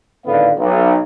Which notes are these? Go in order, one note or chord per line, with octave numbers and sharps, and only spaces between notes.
G#1 A2 D3 B3 F5
B1